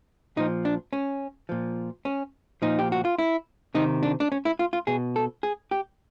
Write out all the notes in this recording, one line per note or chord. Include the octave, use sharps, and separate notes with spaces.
A#2 F3 D#4
D4
C#4
A#2 F3
C#4
A#2 F3 D#4
G4
F#4
F4
E4
C3 D#3 D#4
D4
D4
C#4
E4
F4
F4
B2 G#4
A4
G#4
G4